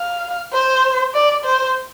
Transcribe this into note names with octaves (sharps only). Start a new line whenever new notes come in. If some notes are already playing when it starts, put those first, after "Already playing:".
Already playing: F5
C5
D5
C5